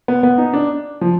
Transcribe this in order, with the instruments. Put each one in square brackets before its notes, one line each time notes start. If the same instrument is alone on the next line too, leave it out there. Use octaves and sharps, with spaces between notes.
[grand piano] B3
B3
D#4
D4
F3